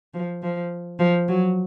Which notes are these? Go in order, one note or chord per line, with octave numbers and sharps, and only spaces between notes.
F3
F3
F3
F#3